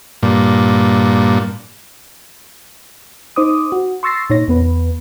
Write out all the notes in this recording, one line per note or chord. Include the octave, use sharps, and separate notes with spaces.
G2 A#2
D#4 C5 D6 D#6
F#4
C6 C#6 E6 A6 A#6 C7
A#2 D#4 C#5 A#6
E2 B3 B4